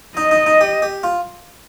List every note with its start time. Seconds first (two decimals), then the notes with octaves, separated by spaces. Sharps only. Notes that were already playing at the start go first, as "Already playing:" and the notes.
0.17 D#4 D#5
0.31 D#4
0.46 D#4
0.61 G4
0.82 G4
1.03 F4